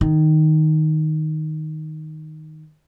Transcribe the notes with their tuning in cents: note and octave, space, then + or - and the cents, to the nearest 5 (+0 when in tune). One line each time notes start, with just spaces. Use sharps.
D#3 +0